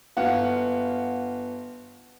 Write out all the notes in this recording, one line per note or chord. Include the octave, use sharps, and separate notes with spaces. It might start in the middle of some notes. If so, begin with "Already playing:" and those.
G1 F5 F#5